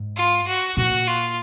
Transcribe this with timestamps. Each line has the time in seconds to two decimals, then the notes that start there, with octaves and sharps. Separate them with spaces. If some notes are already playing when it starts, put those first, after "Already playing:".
Already playing: G#2
0.16 F4
0.47 F#4
0.77 A#2 F#4
1.07 F4